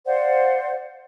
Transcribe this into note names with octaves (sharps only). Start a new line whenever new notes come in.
C5 D5 F5 F#5